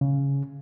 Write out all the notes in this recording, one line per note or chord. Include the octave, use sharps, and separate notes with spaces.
C#3